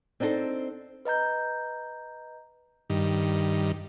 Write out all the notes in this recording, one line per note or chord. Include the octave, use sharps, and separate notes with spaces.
C4 D4 D#4 F4 A4 C5
B4 D#5 A#5 G6
G2 D#3